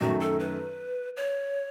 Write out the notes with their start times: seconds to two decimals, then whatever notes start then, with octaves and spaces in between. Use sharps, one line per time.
0.01 F#2 D#3 A3 F#4
0.20 A4
0.39 B4
1.17 C#5